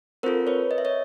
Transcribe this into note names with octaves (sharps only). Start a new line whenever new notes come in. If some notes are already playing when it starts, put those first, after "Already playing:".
C4 F4 A4 A#4 C5
B4 C#5
D#5
E5
C#5 D#5